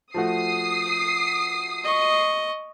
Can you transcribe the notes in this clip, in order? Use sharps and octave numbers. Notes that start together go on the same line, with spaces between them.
F3 A3 F#4 D#6 C7
D#5 C#6